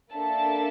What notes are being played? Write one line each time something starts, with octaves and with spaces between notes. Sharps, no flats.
A#3 D4 A4 E5 A5